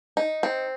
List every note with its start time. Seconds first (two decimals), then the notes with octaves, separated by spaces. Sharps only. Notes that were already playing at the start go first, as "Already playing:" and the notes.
0.17 D#4
0.43 C4